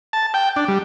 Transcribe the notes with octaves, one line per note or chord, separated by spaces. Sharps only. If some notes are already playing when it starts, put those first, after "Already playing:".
A5
G5
D4
G3